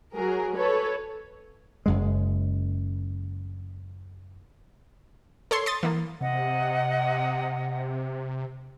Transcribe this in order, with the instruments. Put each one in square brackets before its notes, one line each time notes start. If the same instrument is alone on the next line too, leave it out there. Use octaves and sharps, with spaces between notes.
[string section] F#3 G#4 A#4
A4 B4 C#5
[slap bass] F#1 F#2 G#3
[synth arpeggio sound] A4 C#5 C6
C6 D#6 A6
E3 A#3
[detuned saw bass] C3 [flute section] D#5 F#5